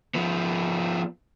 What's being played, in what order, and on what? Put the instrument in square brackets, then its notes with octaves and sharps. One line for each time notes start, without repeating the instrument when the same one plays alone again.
[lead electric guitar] F3 B3